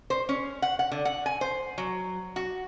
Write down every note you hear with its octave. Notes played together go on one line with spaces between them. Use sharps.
C5
C#4
F#5
F#5
D3
F#5
G#5
C5
F#3
F#4